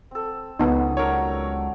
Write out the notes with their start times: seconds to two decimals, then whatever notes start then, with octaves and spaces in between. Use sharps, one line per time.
0.11 C4 A4
0.59 C#2 B3 D#4 F#4 G#4
0.97 F#3 A3 A#4 C#5 D5